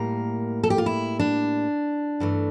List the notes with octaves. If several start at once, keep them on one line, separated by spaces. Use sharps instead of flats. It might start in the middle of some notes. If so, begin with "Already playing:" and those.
Already playing: A2 G3 A#3 A#4
A4
G4
F4
E4
D4
G2 E3 A3